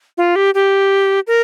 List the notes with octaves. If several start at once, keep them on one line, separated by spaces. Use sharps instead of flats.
F4
G4
G4
A#4